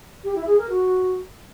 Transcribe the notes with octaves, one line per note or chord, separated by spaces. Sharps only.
G4
E4
G#4
A#4
F#4